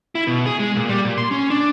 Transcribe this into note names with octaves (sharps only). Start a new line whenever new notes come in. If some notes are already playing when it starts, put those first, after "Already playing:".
E4
B2
G#4
G#3
A#2
G3
A#2
C6
C#4
D4